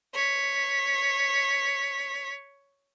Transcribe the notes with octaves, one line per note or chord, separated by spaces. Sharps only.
C#5 B6